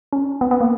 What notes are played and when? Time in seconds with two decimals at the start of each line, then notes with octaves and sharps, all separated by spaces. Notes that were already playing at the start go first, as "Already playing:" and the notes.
0.13 C#4
0.41 B3
0.51 B3
0.61 A#3